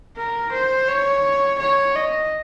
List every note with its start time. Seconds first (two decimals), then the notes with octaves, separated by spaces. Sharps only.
0.16 A#4
0.52 C5
0.88 C#5
1.59 C#5
1.95 D#5